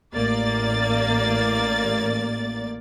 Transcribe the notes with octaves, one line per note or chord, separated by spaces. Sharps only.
A1 A#3 D5 A6